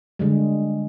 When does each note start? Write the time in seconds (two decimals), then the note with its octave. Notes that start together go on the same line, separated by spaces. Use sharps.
0.19 D3 G3 G#3